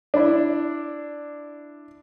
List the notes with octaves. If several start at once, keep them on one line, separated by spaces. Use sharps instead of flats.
D4 E4